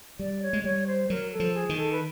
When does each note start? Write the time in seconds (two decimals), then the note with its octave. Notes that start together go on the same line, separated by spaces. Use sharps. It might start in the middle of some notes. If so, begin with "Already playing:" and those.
0.19 G3 D5
0.42 C#5
0.53 G#3
0.64 G3 C#5
0.87 C5
1.10 F#3 A#4
1.32 A4
1.40 F3
1.54 G#4
1.69 D#3
1.77 A4
1.92 B4